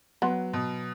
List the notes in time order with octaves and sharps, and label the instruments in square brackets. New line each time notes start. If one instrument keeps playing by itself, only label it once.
[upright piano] F#3 [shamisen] B3
[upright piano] B2